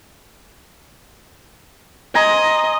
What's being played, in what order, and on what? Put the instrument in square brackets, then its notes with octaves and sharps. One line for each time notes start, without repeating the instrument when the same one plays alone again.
[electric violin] D#5 [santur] G#5 A#5 C6